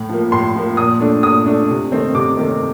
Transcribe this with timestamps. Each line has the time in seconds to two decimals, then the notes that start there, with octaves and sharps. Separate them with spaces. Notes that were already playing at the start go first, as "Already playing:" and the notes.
Already playing: A2
0.09 F3 A#3
0.32 A2 C6
0.55 F3 A#3
0.77 A#2 D#6
1.00 A3 D4
1.23 A#2 D#6
1.46 A3 D4
1.69 C3
1.92 D#3 A3 C4
2.15 C3 D6
2.37 D#3 A3 C4